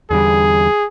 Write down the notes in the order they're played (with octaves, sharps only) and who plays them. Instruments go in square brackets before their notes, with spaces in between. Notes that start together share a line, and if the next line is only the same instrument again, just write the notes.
[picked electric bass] E2 D3 G3 [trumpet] G#4